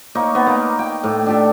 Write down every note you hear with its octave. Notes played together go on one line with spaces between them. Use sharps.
A#3 D#4 C#5
B3
A#3
G5
A2
D4 G4 A4